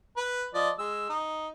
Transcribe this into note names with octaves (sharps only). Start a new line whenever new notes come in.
B4
F3 D5 D#5
G#3 E6
D#4